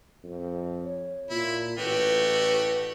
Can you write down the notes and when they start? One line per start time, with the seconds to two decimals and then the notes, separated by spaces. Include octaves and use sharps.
0.24 F2
0.83 C#5
1.30 A#2 E4 F4
1.78 A1 A3 F#4 G4 B4